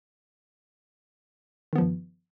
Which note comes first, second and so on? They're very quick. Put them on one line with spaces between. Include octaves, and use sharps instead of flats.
D#3 B3 F3 G2